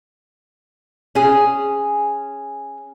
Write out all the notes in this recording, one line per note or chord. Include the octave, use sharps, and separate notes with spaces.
C#4 G#4